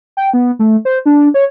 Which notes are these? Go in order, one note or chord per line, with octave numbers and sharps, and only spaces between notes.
G5
B3
A3
C5
D4
C#5